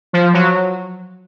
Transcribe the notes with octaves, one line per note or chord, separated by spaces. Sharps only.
F3
F#3